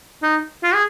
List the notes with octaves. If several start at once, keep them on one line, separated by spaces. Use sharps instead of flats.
D#4
F4
G#4